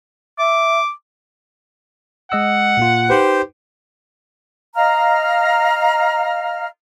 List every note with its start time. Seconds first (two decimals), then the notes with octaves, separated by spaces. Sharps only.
0.39 E5 D6
2.32 G#3 D#5 F#5 E6
2.77 A#2 A#3 F4
3.10 D#4 G4 B4 C5
4.75 D#5 F5 A#5 F6